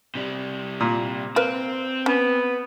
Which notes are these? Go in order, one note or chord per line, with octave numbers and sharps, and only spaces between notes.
C3 G3
A#2
C4 A#4 B4 F5
B3 C#4